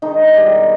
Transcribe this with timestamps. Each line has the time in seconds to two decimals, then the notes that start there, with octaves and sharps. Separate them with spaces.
0.02 D#3 G#3 D#4
0.34 B2 G3 G4